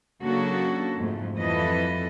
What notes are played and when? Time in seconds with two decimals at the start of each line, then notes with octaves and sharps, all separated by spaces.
0.23 C#3 F#3 A#3 D4 F#4 A4
0.97 F2 G#2 A3
1.36 F2 E3 G3 A4 B4 D#5